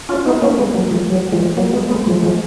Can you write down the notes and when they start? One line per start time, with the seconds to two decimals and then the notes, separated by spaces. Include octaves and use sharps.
0.09 C#4 F4
0.26 B3 D#4
0.42 A#3 C#4
0.58 G#3 B3
0.75 F#3 A#3
0.91 F3 G#3
1.08 F#3
1.32 F3 G#3
1.57 F#3 A#3
1.73 G#3 B3
1.90 G#3 B3
2.06 F3 G#3
2.23 F3 G#3